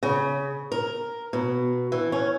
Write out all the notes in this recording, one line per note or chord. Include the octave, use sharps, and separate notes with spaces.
C#3
A#4
B2
E3
C#4